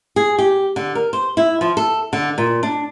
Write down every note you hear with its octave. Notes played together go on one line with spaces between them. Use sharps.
G#4
G4
D3
A#4
C5
E4
F3
A4
D3
A#2
D4